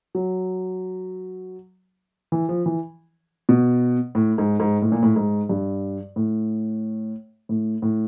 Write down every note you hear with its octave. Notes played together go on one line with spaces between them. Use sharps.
F#3
E3
F3
E3
B2
A2
G#2
G#2
A2
A#2
A2
G#2
G2
A2
A2
A2